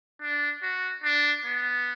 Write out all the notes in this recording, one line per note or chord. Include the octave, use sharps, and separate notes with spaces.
D4
F#4
D4
B3